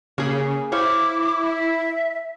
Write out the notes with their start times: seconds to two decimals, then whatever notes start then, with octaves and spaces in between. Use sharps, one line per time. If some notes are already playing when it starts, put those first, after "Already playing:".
0.18 C#3 A#3 G#4
0.72 E4 C5 C#5 F5 D6
1.47 E5